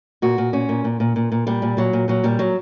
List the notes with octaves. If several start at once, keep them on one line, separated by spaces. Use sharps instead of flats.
A#2 F#4
A#2
A#2 C#4
A#2
A#2
A#2
A#2
A#2
A#2 G3
A#2
A#2 F#3
A#2
A#2 F#3
A#2 G3
A#2 F#3